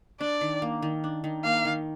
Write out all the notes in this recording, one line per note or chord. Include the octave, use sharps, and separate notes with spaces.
D4 D5
D#3
A#3
D#3
D4
D#3
A#3 F5
D#3